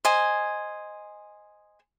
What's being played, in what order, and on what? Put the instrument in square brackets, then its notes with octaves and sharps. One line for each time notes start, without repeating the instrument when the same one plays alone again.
[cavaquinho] C5 D#5 G#5